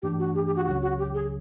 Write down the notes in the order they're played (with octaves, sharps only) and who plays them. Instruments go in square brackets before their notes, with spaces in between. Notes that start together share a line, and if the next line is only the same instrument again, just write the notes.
[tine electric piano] G2 E3 A3 D4 [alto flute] G4
[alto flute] F#4
G4
G4
F#4
[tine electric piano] C#2 C#3 F#3 [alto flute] F#4
[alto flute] F#4
G4
G#4